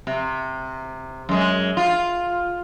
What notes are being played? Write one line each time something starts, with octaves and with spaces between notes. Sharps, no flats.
C3
F#2 G#3
F4